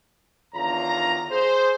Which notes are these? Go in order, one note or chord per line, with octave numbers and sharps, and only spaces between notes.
E2 D3 D#3 F4 C#5 A#5
G#4 C5